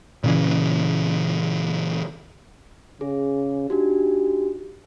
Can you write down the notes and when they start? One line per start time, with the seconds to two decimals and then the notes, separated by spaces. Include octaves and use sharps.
0.24 A#2 C#3 E3
3.01 C#3 G#4
3.70 D4 D#4 F#4 G4